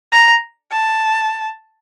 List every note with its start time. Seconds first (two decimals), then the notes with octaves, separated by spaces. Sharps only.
0.12 A#5
0.72 A5